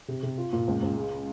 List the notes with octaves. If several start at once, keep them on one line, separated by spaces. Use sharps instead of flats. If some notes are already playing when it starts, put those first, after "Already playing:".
C3
C3
F4
A#2
C#2
C#2
G#3